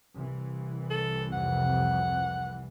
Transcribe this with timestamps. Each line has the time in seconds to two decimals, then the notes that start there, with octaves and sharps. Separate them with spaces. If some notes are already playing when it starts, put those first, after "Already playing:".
0.14 C2 E3
0.91 A4
1.33 F2 C3 F#5